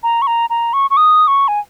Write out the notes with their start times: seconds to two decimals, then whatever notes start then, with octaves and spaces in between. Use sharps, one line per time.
0.03 A#5
0.22 C#6
0.27 A#5
0.50 A#5
0.73 C#6
0.90 C#6
0.97 D#6
1.28 C#6
1.48 G#5